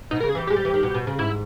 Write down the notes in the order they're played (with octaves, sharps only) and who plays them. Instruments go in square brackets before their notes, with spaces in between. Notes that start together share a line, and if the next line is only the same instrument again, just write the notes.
[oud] B2 [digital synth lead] D#4
[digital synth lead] A#4
[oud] C#3
[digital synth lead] G#4
[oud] E3 [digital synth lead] G4
[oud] G#3 [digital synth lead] G4
[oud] G3
E3
D#3
B2
B2
C#3
[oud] G#2 [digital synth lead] E4